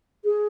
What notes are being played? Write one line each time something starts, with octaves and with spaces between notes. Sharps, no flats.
G#4